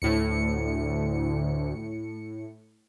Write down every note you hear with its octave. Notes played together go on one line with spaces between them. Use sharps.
D2 A2 C#7